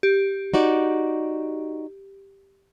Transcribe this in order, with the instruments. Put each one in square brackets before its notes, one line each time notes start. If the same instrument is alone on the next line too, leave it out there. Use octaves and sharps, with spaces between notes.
[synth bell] G4
[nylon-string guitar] D#4 F#4 D5